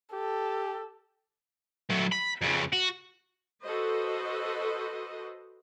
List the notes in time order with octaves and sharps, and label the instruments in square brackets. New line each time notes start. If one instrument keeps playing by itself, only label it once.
[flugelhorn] G4 [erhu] A4
[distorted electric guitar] F#3 A3
B5
F2 C#3
F#4
[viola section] F#4 A4 B4 C5 D#5